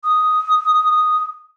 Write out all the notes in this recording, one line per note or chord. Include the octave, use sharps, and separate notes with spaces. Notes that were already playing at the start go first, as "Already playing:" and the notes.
D#6